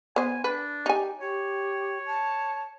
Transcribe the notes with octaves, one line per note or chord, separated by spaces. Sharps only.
B3 C5 G#5
D4 B4
D#4 G4 G#5
G4 C#5
A5